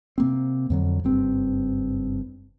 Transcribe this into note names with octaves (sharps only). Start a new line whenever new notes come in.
C3 A#3 C4
F2 D3 F#3
F#1 G2 C4